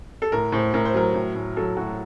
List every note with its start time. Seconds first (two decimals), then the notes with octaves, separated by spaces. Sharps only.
0.22 A4
0.32 A2 A#4
0.52 A2 C5
0.74 A2 A#4
0.85 C5
0.94 F#3 A#4
1.14 A2
1.35 A2
1.57 F#3 A4
1.77 A2 F#4